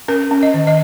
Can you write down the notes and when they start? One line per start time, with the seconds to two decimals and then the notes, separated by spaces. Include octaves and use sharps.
0.08 C#4 A#4
0.31 C#4
0.43 D#5
0.54 D#3
0.67 D#5